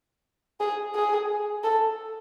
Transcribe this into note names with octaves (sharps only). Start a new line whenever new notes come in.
G#4
G#4
A4